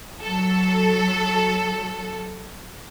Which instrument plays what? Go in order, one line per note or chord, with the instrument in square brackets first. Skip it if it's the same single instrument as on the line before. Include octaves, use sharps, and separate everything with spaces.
[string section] F#3 A4